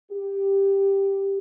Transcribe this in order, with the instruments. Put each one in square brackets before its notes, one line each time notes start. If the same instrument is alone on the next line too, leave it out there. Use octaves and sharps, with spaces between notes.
[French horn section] G4